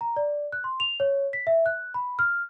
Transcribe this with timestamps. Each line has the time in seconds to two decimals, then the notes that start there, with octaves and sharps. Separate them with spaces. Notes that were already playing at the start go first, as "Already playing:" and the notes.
0.01 A#5
0.16 D5
0.52 F#6
0.64 C6
0.80 F7
1.00 C#5
1.33 B6
1.47 E5
1.66 F#6
1.94 B5
2.19 F6